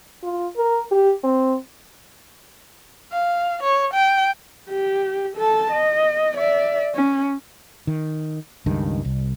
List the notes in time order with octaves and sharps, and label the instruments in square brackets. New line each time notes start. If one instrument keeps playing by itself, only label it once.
[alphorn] F4
A#4
G4
C4
[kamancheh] F5
C#5
G5
[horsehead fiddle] G4
A4 A5
D#5
D5 E5
C#4
[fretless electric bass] D#3
C#2 G2 D#3
C2